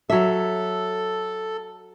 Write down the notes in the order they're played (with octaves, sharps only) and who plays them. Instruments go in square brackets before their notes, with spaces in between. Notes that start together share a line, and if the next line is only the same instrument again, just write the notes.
[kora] F#3 E5 [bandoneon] A4